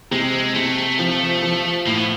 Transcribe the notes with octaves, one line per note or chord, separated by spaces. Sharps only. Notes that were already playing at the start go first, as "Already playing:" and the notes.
C3 G#3
C3 A3
F3
F3
A2 A#3
B3